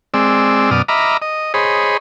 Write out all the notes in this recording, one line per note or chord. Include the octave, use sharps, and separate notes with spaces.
G#3 C4 D5 E6
F#2 B2 D5 D#6 F6
D#5 E5 A#5 B5 D6 F6
D#5
G#4 C5 C#5 D#5 B5